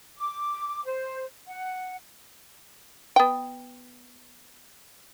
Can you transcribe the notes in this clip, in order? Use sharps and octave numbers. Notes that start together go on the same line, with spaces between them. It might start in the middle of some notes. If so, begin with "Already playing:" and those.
D6
C5
F#5
B3 G5